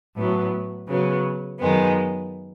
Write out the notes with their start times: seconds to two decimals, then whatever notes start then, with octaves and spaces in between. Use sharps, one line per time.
0.16 A2 F#3 B3
0.88 C#3 F#3 B3
1.60 F#2 D#3 G#3 B3